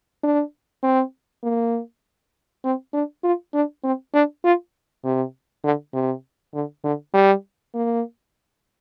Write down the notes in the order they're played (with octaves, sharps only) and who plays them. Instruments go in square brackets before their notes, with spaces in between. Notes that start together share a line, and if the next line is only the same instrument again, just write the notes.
[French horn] D4
C4
A#3
C4
D4
F4
D4
C4
D4
F4
C3
D3
C3
D3
D3
G3
A#3